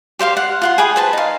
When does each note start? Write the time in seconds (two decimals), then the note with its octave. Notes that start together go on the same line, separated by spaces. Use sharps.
0.19 G4 C5 F5 C6
0.37 F#5
0.62 F4 F#5 C6
0.78 G#4 G5 B5 D#6
0.96 B4 C5 A5
1.13 D#4 F5